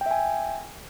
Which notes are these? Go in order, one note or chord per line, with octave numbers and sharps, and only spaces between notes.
E5 G5 G#5